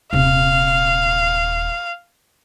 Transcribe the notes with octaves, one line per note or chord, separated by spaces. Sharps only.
D#1 C3 F5